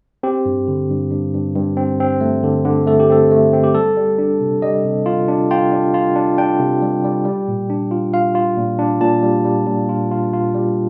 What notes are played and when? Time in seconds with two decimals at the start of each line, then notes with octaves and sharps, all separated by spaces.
0.23 C4 G4
0.46 G2
0.68 D3
0.90 G2
1.11 G2
1.34 G2
1.56 G2
1.77 C4
2.00 C4
2.21 A3
2.44 D3
2.65 D3
2.87 A3 A4
3.00 G4
3.09 C4 A4
3.31 A3
3.53 C4
3.64 G4
3.74 G3 A4
3.97 G3
4.19 D4
4.41 C3
4.62 G3 D#5
4.84 C3
5.06 F4
5.28 D4
5.51 F4 G5
5.72 D4
5.94 F4
6.16 D4
6.38 D4 G5
6.60 C3
6.82 G3
7.04 G3
7.25 G3
7.48 A#2
7.70 D4
7.91 F4
8.14 F4 F5
8.35 F4
8.57 A#2
8.79 D4
9.01 A#2 A5
9.23 G3
9.45 G3
9.67 A#2
9.89 F4
10.11 F4
10.34 F4
10.55 G3